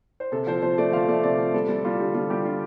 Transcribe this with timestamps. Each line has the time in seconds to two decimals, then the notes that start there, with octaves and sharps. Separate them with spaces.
0.20 C5
0.32 C3 A4
0.47 F3 C5
0.62 F3 C5
0.78 A3 D5
0.93 F3 F5
1.08 A3 D5
1.23 C3 D5
1.38 F3
1.54 G3 A4
1.68 G3
1.84 G3 F4
1.99 D3 G4
2.15 G3 F4
2.30 G3 G4
2.45 D3 F4